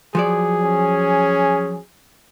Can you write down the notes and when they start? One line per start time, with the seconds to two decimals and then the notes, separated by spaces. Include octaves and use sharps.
0.15 F3 F#3 G#4 D5
0.63 C#4